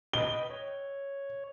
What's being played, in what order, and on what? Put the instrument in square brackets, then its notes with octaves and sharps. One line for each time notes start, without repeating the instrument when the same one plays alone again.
[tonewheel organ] B4 D#5 G5 [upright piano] G7
[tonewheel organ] C#5